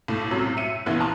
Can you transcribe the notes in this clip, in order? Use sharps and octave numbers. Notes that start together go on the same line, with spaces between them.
B1 A2 A3
F#2 A2 C3 F#3
E5 C#7 D#7
F1 A#1 C#3 E3 B3 F#6
A5 A#5 C6 D#6 F#6